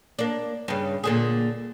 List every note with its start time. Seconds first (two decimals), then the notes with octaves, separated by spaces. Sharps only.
0.19 A#3 D4
0.68 G2 C#3
1.04 A#2 D3 G#4